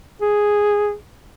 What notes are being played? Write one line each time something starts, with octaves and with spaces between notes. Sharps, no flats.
G#4